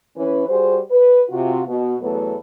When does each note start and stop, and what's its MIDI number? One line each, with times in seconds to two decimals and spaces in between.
0.17 0.45 52
0.17 0.45 61
0.17 0.45 71
0.49 0.80 55
0.49 0.80 66
0.49 0.80 68
0.49 0.80 72
0.91 1.22 71
1.30 1.63 48
1.30 1.63 65
1.30 1.63 66
1.68 1.95 47
2.01 2.36 40
2.01 2.36 54
2.01 2.36 57
2.01 2.36 59
2.01 2.36 69
2.01 2.36 71